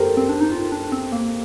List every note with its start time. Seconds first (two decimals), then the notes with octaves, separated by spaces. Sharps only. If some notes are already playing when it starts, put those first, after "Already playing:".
Already playing: G4 A4 A#4 C5
0.17 C4
0.29 D4
0.41 D#4
0.52 F4
0.72 D4
0.92 C4
1.12 A#3